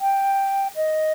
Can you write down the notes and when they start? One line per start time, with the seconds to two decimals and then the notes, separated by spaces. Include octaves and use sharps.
0.01 G5
0.76 D#5